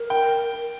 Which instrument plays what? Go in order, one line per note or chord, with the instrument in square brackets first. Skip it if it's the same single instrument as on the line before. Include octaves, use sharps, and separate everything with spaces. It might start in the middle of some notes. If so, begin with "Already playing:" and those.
Already playing: [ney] A#4
[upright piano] G5